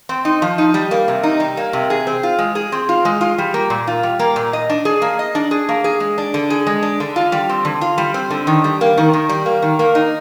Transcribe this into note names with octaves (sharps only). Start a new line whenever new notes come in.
C4
D#4
F3
D#4
G3
A#3
C3
D#4
G3
A#3
C3
G#4
C4
F4
G#3
G#4
C4
F4
G#3
F4
G3
A#3
A#2
F4
G3
A#3
A#2
D#5
D4
G#4
A#3
D#5
D4
G#4
A#3
G#4
G#3
D4
D3
G#4
G#3
D4
D3
F4
G3
C4
D3
F4
G3
C4
D3
D#3
G3
A#3
D#3
D#3
G3
A#3
D#3
A#3
D#4